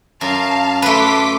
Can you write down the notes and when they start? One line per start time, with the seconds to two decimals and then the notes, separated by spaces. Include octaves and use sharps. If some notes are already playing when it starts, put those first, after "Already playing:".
0.21 F#2 F5 A5
0.82 A3 B4 C6 D6 B6